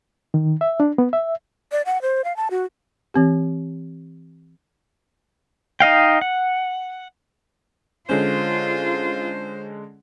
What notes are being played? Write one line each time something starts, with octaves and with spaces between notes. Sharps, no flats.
D#3
E5
D4
B3
E5
D5
F#5
C5
F5
A5
F#4
E3 C4 G4
D#4 D#5 F5 G5
F#5
D3 G#3 C#4 F4 C5